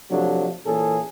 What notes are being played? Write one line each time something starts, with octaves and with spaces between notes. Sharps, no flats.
C3 F3 F#3 A3 D4
A#2 E3 C#4 G#4 A4